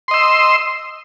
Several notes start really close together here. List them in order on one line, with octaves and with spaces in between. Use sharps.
C6 D#5 E6